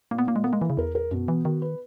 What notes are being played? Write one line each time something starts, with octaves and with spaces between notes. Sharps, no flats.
A#2 A#3
B3
A#2 A#3
G#3
A#3 B3
G#3
E3 E4
C#3
E2 A#4
A#4
F#2 B2
E3 B3
D#3 F#4
B4